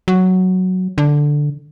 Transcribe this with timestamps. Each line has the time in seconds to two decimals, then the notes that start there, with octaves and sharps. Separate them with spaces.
0.08 F#3
0.98 D3